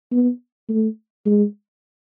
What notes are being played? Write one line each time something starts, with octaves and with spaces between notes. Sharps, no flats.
B3
A3
G#3